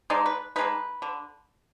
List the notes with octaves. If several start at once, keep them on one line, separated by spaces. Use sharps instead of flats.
D3 G#3 D#4 D5
B4
D3 G#3 D#4 B4
D3